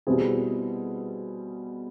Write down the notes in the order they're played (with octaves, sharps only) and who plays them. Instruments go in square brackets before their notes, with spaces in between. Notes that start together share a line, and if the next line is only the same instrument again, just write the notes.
[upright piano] B2 G3 C4 E4 G#4